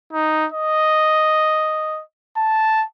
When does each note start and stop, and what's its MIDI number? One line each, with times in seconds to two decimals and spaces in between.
0.13 0.47 63
0.52 2.02 75
2.37 2.84 81